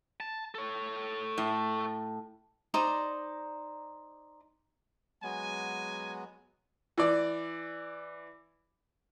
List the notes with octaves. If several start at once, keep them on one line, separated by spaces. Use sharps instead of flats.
A5
A4 C#5
A2
D#4 C5 D5 A#5
F#3 G#3 B3 G#5
E3 D5